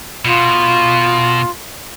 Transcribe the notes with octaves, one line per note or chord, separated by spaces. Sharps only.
B2 F4